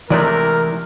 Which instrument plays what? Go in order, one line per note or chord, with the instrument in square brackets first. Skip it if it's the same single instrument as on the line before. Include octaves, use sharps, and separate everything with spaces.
[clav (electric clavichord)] C3 G#3 A3 [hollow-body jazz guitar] E3 D5 [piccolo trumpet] A#4